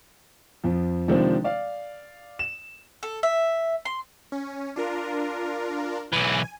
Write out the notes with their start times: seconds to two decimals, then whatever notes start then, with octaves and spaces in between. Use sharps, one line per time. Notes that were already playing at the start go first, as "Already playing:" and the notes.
0.64 F2 F3
1.08 C3 D#3 F3 G#3 C4 D4
1.44 D5 F5
2.39 E7
3.03 A4
3.23 E5
3.85 C6
4.32 C#4
4.76 D4 F4 A#4
6.13 B1 E3 G#5